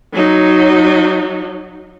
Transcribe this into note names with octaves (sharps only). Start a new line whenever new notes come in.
F#3 D#4